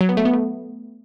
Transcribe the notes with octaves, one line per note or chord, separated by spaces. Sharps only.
F#3
B3
A3
B3
A3